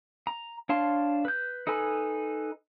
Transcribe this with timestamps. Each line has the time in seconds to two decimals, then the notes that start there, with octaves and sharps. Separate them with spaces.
0.27 A#5
0.69 D4 C#5 F5 A5 C6
1.25 B4 G6
1.67 D#4 A4 B4 G#5 B5